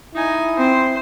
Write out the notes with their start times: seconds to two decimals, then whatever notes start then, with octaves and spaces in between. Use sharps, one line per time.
0.15 D#4 E4 G#5
0.59 C4 C5